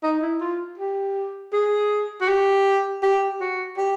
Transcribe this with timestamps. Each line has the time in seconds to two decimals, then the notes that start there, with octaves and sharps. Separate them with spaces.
0.03 D#4
0.22 E4
0.41 F4
0.78 G4
1.53 G#4
2.21 F#4
2.28 G4
3.03 G4
3.40 F#4
3.77 G4